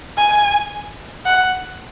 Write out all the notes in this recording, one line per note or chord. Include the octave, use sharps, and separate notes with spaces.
G#5
F#5